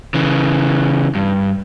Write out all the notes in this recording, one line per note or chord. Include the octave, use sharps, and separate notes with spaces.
C#3 E3
G2